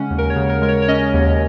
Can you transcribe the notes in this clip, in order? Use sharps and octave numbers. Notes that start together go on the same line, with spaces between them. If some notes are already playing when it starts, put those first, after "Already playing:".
Already playing: C#3 G#3 C#4 F#5
D#2
A#4
C#5
C#3
A#4
G#3 A#4
C#5
C#5
C#4 D#5
D#2